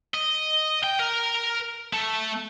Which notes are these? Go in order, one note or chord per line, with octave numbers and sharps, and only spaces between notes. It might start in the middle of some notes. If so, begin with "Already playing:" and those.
D#5
G5
A#4
A3